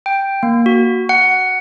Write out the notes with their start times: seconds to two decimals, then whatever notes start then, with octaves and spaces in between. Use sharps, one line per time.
0.06 G5
0.43 A#3
0.66 F#4
1.09 F#5